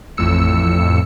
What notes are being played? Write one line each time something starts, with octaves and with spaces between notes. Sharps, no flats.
A1 F2 A2 E6 C#7